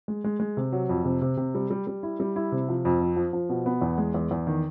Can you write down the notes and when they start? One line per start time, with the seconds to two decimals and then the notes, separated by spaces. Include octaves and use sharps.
0.08 G#3
0.24 G#3
0.40 G#3
0.57 C3
0.72 F#3
0.89 F2
1.05 C3
1.22 C3
1.37 C3
1.55 G3
1.70 G3
1.87 G3
2.03 E4
2.20 G3
2.36 E4
2.52 C3
2.69 F3
2.85 F2
3.01 F3
3.16 F3
3.33 F3
3.49 B2
3.66 B3
3.82 E2
3.98 G#3
4.14 E2
4.31 E2
4.47 D#3